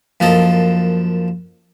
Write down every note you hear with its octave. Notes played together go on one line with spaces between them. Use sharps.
F#2 F3 A#3 A4 D#5